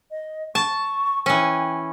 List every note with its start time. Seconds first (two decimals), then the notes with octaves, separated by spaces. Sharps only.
0.11 D#5
0.55 A5 C#6
1.26 E3 C#4 G5